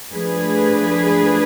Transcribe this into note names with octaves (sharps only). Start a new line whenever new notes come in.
F3 A3 D4 G#4 B4